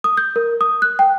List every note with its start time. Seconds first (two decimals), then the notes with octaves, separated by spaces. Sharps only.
0.04 D#6
0.17 G6
0.36 A#4
0.61 D#6
0.82 F#6
0.99 G5